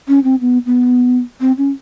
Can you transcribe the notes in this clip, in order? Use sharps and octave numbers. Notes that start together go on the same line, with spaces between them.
C#4
C4
B3
B3
C4
C#4